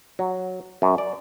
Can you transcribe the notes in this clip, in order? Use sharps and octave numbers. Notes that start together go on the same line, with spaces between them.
F#3
F#2
D5